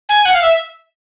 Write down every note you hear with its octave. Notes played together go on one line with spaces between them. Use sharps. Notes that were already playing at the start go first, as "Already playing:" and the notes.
G#5
F#5
F5
E5